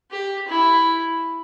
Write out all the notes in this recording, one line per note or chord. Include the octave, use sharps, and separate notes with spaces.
G4
E4